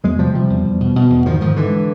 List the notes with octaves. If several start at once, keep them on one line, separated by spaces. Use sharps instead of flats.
E2 F#3 G#3
C3 F3 G3
C3 F3 G3
E2
E2
B2
B2
E2
G#2 D#3 F3
G#2 D#3 F3
G#2 D3 E3